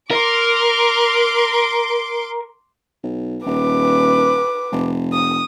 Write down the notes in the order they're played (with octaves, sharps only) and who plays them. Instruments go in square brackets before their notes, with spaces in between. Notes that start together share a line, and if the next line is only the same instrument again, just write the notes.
[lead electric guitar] A#4 [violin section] C6 D6 D7
[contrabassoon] B1
[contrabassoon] D#1 [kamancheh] B4 D6
[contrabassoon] F1
[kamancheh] D#6